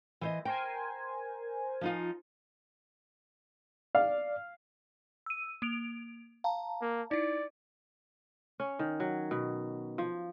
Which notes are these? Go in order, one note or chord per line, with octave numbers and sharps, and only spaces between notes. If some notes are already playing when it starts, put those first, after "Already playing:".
E3 C5 D#5
A#4 C5 G5 G#5
F3 D#4 F4
D5 F5
E6 D#7
A#3 D7 F7
F5 A5 A#5
A#3
D#4 E4 D5
C#4
D#3
F#3
B2
F3